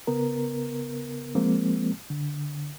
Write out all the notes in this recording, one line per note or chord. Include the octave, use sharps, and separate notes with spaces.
C#3 B3 A#4
F3 G#3 A#3 C4
D3